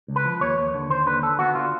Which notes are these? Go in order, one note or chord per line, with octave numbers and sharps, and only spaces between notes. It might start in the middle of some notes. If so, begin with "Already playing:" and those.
C#2
B4
F3
D#2 C#5
D#2
D3
D#2 C5
D3 B4
D3 A4
B3 F#4
D3 F4